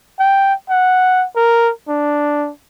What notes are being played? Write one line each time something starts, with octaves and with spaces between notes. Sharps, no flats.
G5
F#5
A#4
D4